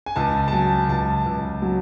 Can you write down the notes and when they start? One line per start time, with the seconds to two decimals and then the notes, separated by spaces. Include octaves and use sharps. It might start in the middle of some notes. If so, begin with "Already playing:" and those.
0.06 G#5
0.16 C#2 A5
0.48 A5
0.52 F#3 G#5
0.89 C#2 A5
1.26 C#2
1.62 F#3